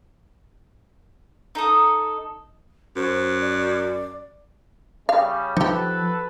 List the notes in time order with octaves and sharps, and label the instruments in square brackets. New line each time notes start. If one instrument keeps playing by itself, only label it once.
[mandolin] D#4 A4 D#6
[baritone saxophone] F#2 [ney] C5
[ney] D5
[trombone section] C#3 G3 [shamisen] F5
[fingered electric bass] F3 [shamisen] D#4 G4 [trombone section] F#4 A4 B4